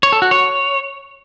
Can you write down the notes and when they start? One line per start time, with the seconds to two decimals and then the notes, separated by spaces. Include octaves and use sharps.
0.03 C#5
0.12 A4
0.22 F#4
0.31 C#5